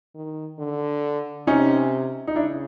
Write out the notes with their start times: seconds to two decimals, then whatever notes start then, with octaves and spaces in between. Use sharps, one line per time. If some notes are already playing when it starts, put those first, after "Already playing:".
0.15 D#3
0.59 D3
1.47 C3 C#4 D#4
2.28 D#4
2.35 C#3 D4 E4